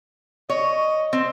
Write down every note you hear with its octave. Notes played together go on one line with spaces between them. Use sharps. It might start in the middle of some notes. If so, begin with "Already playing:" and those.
C#5 D#5
C4